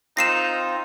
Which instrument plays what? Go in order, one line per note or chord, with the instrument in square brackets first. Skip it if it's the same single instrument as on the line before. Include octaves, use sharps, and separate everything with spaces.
[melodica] C4 F4 [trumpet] D#4 [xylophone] A#6 C7 E7